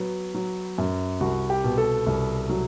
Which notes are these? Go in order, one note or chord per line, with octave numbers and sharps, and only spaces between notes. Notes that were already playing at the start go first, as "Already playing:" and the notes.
Already playing: F#3 B3
F#3
F#2
C2 F#4
G4
B2
A4
C2
F#3